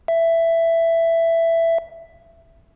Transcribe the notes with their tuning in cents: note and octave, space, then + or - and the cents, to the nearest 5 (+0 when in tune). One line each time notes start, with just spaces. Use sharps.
E5 +10